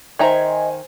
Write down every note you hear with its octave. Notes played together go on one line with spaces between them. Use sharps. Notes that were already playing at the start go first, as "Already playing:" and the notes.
D#3 C5 D#5 E5 G#5 A#5